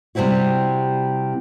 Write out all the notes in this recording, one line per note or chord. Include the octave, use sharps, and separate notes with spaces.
C3 G3 C4 E4 F#4